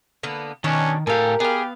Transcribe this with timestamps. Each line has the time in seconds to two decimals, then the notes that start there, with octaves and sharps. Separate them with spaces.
0.23 D3 A#3 B3
0.64 B2 D#3 C#4 D4 C#5
1.07 A2 G4 A4 A#4 F5 G#5
1.40 B3 G4 G#4 F5